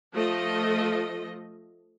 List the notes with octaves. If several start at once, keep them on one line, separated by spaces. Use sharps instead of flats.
F3 A3 A4 D#5